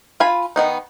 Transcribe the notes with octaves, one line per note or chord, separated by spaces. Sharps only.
F4 G#5 B5
D#3 B3 D#4